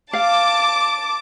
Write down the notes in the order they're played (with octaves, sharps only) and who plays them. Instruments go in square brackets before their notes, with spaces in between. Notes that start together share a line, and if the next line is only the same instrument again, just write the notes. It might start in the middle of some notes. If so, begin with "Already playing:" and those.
[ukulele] F5 [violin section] A5 D6